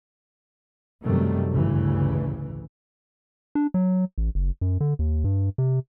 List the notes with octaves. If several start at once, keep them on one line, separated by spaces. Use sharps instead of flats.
F#2 C3 D#3 F#3 G3 A3
A1 D2 G2 C#3 E3
D4
F#3
A1
F#1
F#2
D3
D#2
G2
C3